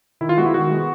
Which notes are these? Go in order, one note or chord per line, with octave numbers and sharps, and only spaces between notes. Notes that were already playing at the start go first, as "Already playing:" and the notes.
D#3 E4
F4
G#3 B3 F#4
E4
D#3 F#4
G#3 B3